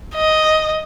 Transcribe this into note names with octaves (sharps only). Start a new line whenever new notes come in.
D#5